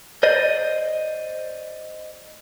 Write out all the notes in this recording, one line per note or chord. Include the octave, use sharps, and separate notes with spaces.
C5 D5 D#5